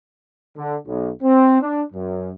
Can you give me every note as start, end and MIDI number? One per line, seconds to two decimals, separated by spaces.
0.57 0.75 50
0.86 1.10 35
1.22 1.60 60
1.61 1.82 62
1.93 2.32 42